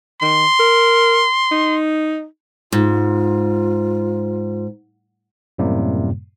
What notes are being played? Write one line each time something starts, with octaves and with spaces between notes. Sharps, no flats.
D#3 C6
A#4
D#4
G#2 F4
F#2 A2 C3 G3 A#3